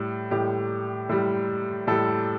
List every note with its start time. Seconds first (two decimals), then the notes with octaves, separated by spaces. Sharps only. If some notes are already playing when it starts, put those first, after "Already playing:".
Already playing: A2 G3
0.31 A2 G3 G4
1.09 A2 G3
1.87 A2 G3 A4